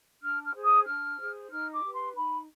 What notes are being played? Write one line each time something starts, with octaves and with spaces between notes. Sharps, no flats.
D4 F6
F6
G#4 C5
D#6
D4 F6
G#4 C5
D#4 F6
D6
G4 B4
C6
D#4 B5